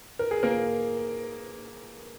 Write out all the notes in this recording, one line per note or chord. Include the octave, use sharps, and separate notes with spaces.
A#4
G#4
A#3 A#4